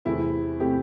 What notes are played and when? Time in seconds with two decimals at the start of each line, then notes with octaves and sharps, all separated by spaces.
0.05 E2 C3 A3 C4 E4
0.60 C3 A3 C4 G4